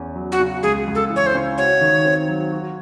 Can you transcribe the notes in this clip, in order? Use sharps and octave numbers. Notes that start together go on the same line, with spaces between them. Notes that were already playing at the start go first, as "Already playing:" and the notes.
Already playing: E2 C#4
F#3
F#4
C#3
C#2 G#4
C#2
A4
E3
C#5
C5
C#3
F#4 C#5
D#3
C4
F#3
F#4